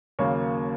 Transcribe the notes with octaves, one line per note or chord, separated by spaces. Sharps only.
D#2 C#3 F#3 A#3 C#5